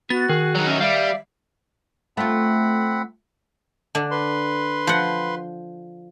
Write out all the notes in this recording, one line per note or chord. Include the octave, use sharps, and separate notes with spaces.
B3 F#4 A6
D#3 G#4
F#3 D#4
C#4 E5
G3 D5 E5 F5
A3 C4 F4 F#5 B5
D3 D4
B4 C6
F3 F#5